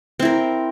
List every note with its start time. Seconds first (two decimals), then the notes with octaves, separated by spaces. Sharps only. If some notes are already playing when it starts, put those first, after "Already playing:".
0.20 C4
0.22 E4
0.25 A#4